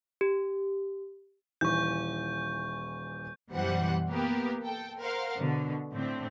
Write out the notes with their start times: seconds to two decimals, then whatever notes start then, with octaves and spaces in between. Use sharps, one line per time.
0.21 G4
1.61 D#1 E3 C#6 G6
3.50 F#2 B2 E3 G3 C5 F#5
4.11 A#3 B3 G4 A#4
4.65 A4 G5
5.00 A#4 C5 F5 F#5
5.37 B2 D3
5.92 A2 D3 C4